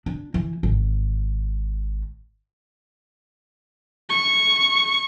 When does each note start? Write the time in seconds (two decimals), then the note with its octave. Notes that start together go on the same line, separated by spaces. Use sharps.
0.06 D4
0.34 E3
0.63 G#1
4.09 C#6